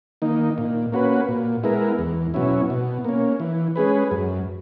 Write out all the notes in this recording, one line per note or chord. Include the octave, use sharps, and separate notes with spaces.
D#3 A#3 D#4
A#2
A#3 C#4 F#4 B4
A#2
G#3 B3 E4 A#4
E2
B2 F#3 C#4 E4
B2
A#3 C#4
E3
G#3 C#4 G#4 B4
F#2